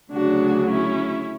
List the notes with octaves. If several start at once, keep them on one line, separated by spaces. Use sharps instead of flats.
D2 C#3 F#3 D4 F#4
C#4 E4